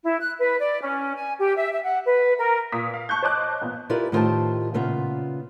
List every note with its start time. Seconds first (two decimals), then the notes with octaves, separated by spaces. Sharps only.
0.04 E4
0.20 F#6
0.38 B4
0.59 D5
0.82 C#4
1.16 G#5
1.39 G4
1.56 E5
1.71 E5
1.84 F#5
2.06 B4
2.38 A#4
2.72 A#2 D#6 B6
2.94 F5
3.09 A5 C#6 F#6 G6
3.22 C5 C#5 D#5 A5 D6 F#6
3.62 A1 A#2 B3
3.90 E4 F4 G4 A#4 B4 D5
4.12 A2 D#3 F4 G4 C5 A5
4.74 A#2 C#3 B3 F4 E5